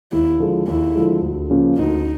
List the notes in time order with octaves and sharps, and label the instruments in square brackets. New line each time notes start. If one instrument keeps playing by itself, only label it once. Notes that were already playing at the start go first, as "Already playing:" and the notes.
[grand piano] D#2 [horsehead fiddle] E4
[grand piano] D3 F3 G#3
[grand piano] D#2 [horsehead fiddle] E4
[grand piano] D3 F3 G#3
D2
C#3 F3 A#3 C#4
[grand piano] D2 [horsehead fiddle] D#4